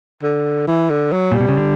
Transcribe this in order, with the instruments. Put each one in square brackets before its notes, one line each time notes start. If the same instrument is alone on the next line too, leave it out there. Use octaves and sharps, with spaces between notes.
[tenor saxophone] D3
E3
D3
F#3
[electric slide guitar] A#2 [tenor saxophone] G3
[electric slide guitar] B2
C#3
D3